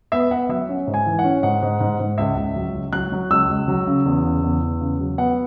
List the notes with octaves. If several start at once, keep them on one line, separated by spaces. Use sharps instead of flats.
B3 E5
B3 F#5
F#3 E5
C#4
G#2
G#5
E3
F#5
C#4
G#2 F#5
G#2
G#2
G#2
C#2 E5
C#2
F#3
C#2
F#3 F#6
F#3
C#2 E6
C#2
F#3
C#3
E2
C#3
E2
E2
C#3
F#3
B3 F#5